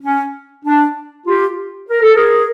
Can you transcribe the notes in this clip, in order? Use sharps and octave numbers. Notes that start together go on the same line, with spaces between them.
C#4
D4
F4 G4
A#4
A4
G#4 A#4